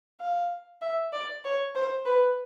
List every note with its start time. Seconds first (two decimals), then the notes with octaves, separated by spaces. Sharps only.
0.21 F5
0.82 E5
1.12 D5
1.44 C#5
1.75 C5
2.06 B4